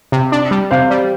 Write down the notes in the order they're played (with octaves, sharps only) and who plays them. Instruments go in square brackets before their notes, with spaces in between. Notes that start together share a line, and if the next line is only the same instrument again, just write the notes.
[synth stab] C3
D4
G3
[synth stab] C3 [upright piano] C5 F5
[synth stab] G3